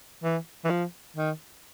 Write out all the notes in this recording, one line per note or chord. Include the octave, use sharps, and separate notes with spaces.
E3
E3
F3
D#3